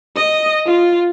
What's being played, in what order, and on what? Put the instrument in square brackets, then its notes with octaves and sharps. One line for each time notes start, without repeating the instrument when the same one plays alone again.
[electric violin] D#5
F4